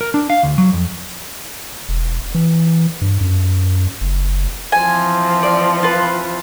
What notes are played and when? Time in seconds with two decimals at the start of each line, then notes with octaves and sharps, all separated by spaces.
0.01 A#4
0.14 D4
0.30 F5
0.43 D2
0.58 F#3
0.73 F2
1.89 E1
2.35 E3
3.01 G2
3.21 F#2
4.01 F#1
4.72 E3 F3 C4 G#5
5.43 D5
5.83 F4 B4